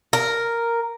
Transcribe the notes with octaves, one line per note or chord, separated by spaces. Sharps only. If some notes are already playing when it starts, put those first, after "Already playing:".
A#4